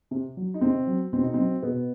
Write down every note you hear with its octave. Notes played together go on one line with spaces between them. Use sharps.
C3
F#3
D#4
C3 C4
F#3
B2 C4
D#4
F#3 C4
B2 B3